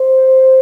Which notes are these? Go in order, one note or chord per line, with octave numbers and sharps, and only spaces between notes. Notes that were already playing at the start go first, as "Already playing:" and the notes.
Already playing: C5